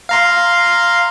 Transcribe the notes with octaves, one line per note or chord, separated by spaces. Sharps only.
F5 A#5 C6